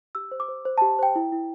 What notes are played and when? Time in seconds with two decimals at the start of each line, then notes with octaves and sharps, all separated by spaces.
0.15 G4 E6
0.31 C5
0.40 D6
0.49 C5
0.65 C5
0.78 A5
0.82 G4
0.99 C5 G5
1.15 E4
1.32 E4